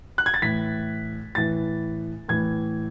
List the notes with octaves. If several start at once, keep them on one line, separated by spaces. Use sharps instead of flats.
F#6
G#6
A6
A2 E3 B6
A2 E3 A6
A2 E3 G#6